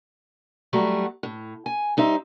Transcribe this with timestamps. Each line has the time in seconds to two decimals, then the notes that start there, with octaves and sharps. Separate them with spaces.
0.73 F#3 G3 A3 E4 F#4
1.23 A2
1.66 G#5
1.97 G3 D#4 C5 E5